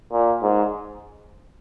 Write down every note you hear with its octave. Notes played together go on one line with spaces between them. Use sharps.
A#2
G#2